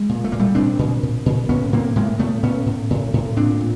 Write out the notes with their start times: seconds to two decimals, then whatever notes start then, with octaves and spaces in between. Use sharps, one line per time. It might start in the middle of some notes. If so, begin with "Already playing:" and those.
Already playing: G#3
0.09 A#2
0.24 A3
0.32 A#2 A#3
0.39 G3 A3
0.55 A#2 C4 D4
0.79 A#2
1.03 A#2
1.26 A#2
1.49 A2 B3 C#4
1.72 A2 A#3 C4
1.96 A2 G#3 A#3
2.19 A2 A3 B3
2.43 A2 B3 C#4
2.66 A2
2.90 A2
3.13 A2
3.36 A#2 C4 D4
3.60 A#2